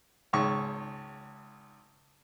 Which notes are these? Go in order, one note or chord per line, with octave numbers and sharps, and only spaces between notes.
G#1 C#2 C#6